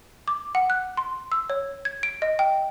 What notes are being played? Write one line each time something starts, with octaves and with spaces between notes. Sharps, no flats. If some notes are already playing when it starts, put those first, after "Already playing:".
D6
F#5
F#6
C6
E6
C#5
G#6
D7
D#5
G5